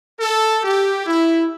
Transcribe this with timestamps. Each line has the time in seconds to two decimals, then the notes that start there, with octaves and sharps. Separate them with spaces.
0.20 A4
0.64 G4
1.06 E4